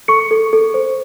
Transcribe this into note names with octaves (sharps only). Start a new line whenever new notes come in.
A4 C#6 C#7
A4
A4
C5